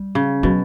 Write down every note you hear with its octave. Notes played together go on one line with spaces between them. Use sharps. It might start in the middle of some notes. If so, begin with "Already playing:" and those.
Already playing: G3
C#3
B2 F#3